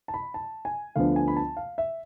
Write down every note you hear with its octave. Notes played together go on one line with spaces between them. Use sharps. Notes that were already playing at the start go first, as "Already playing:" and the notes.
A5
B5
A5
G#5
D2 D3 F3 B3 D4 F5
G#5
B5
A5
F5
E5